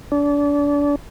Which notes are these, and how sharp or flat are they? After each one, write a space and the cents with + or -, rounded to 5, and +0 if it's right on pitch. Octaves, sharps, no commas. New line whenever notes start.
D4 -30